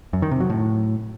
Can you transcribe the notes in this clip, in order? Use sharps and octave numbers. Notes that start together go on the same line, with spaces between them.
F#2
D#3
C3
F#3
A2